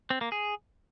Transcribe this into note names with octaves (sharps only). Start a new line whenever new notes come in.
C4
A#3
G#4